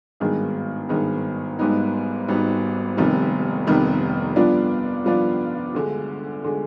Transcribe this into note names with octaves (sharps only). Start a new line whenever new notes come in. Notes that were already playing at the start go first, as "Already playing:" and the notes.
G#1 G2 D#3 G#3 B3
G#1 G2 D#3 G#3 B3
G#1 G#2 G3 B3 D#4
G#1 G#2 G3 B3 D#4
F1 F2 D#3 G3 B3
F1 F2 D#3 G3 B3
G2 F3 B3 D4 F4
G2 F3 B3 D4 F4
D2 D3 G#3
D3 G#3